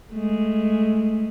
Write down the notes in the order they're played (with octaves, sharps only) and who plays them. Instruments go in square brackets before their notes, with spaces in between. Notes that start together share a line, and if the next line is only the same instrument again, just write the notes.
[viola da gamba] G#3 A3